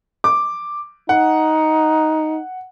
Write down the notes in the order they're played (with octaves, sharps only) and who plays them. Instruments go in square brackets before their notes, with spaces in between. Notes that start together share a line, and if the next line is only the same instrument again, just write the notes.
[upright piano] D6
[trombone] D#4 [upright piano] F#5